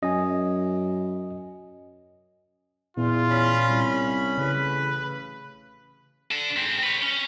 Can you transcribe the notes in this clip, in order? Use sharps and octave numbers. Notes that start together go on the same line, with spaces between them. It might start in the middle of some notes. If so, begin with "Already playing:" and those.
F#2 D#5 G#5
E2 A#2 F4
C#4 B5
C2
A1 C#3 B4
D4 A4
G#2 C4
B4 C#5
C#4